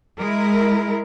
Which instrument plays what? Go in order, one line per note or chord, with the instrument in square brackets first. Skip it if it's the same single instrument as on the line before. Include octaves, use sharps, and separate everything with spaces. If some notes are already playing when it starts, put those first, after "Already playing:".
[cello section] G#3 E4 A#4